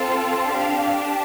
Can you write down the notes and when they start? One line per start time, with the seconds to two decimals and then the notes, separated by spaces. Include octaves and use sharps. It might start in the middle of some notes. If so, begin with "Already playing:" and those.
Already playing: C4 F4 A4
0.48 D4 G4 F5